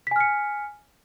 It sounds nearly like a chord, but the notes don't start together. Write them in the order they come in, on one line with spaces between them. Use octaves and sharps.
B6 G#5 F6 C#7